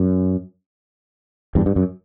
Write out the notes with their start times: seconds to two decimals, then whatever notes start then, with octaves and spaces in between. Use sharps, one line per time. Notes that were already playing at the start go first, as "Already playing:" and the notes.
Already playing: F#2
1.55 E2 G2
1.66 G2
1.76 F#2